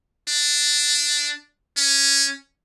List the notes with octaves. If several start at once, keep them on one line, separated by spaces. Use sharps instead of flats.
D4
C#4